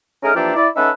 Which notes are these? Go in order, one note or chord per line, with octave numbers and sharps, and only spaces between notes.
A3 C#4 D#4 G#4 A#4
E3 F3 A#3 D4 G4 A4
E4 D5
C#4 D#4 A4 B4 E5 F#5